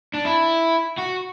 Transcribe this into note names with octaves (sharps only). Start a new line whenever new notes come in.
D4
E4
F#4